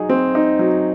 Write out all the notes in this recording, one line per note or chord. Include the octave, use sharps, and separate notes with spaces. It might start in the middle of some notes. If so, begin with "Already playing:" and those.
Already playing: F#3 D#4 G#4
C4
D#4
F#3